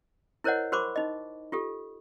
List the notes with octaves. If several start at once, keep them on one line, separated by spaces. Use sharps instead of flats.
E4 A#4 C5 C#5 D#5 F#5
F#4 A#4 C5 B5 C#6 D6
D#4 D#5
F4 G4 A4